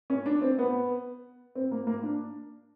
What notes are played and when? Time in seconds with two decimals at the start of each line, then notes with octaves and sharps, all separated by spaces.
0.10 C#4
0.26 D4
0.42 C4
0.58 B3
1.55 C4
1.71 A#3
1.87 A#3
2.03 D4